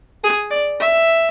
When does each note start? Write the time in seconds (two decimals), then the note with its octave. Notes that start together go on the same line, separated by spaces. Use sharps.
0.24 G#4
0.51 D5
0.80 E5